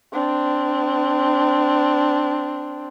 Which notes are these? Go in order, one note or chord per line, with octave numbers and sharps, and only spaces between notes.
C4 D4